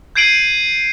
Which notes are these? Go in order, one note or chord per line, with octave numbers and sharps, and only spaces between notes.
G6 G#6 C7 D7 D#7 F#7